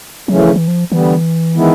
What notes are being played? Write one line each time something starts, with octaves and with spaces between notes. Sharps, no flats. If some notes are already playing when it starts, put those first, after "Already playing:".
C#3 E3 F#3 A3 C#4
F3
E3
F3
D3 E3 G3 B3
D#3 G#3 B3 E4